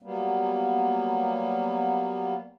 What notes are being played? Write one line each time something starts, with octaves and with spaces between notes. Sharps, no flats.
F#3 G3 A#3 B3